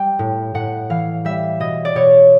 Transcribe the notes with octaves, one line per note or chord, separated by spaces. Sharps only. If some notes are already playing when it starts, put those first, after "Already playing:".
Already playing: G3 G5
A2
A2 F#5
E3 F5
G3 E5
B2 D#5
D5
B2 C#5